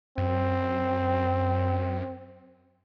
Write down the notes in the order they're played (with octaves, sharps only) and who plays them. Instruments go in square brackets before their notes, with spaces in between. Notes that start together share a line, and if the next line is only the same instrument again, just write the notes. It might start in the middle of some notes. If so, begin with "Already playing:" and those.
[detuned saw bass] F#2 [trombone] C4